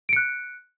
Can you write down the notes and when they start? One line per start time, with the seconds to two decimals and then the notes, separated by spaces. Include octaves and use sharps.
0.09 D7
0.13 C#7
0.16 F#6